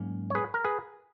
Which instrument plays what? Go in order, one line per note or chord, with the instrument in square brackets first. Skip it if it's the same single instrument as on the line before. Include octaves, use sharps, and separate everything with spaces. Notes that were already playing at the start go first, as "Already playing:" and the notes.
Already playing: [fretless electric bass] G#2 F#3 A#3 C#4
[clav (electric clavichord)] C#5
G#4 B4
A#4
G#4 B4